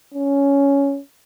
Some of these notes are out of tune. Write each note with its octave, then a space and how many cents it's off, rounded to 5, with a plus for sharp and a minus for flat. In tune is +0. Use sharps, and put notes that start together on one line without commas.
C#4 +10